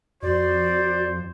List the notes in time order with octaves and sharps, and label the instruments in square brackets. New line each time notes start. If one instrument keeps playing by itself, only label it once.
[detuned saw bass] F2 [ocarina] F#4 [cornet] C5 [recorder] D5